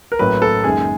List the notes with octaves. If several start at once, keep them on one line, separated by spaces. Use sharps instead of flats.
A#4
A1 A2 F#3 A#3 B4
A4
F#1 F#2 D#3 G#3 G#4